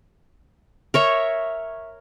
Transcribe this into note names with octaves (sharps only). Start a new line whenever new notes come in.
A#4 C#5 E5